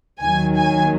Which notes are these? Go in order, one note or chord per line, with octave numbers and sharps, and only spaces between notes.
D#2 D#3 F#3 G#5
G#5